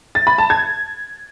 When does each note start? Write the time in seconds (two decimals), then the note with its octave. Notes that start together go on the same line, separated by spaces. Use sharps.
0.15 A6
0.27 B5
0.38 A5
0.50 G#6